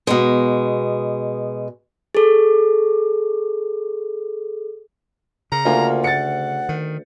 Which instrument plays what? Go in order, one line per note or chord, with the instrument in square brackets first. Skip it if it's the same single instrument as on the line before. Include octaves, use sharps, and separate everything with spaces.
[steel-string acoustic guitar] B2 G#3
[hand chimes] G#4 A4
[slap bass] C#3 [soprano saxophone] A#5
[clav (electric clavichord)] D2 [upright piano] A#3 F4
[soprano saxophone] F#5 [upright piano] A6 C#7
[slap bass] D#3